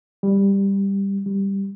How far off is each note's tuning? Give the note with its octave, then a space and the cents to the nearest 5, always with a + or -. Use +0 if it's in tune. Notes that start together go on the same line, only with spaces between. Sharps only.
G3 +10
G3 +5